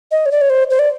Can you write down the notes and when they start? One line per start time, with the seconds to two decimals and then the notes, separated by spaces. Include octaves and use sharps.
0.11 D#5
0.26 C#5
0.32 D5
0.41 C#5
0.50 C5
0.70 C5
0.79 D5